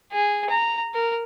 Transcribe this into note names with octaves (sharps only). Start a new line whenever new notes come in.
G#4
A#5
A#4